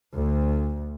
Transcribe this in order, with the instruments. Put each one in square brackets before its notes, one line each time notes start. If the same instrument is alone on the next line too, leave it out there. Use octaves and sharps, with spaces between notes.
[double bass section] D2